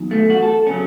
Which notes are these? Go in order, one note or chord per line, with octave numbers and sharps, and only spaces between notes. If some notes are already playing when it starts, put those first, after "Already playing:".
Already playing: E2 D#3 F#3
A3
F#4
A4
C#3 F#3 C#4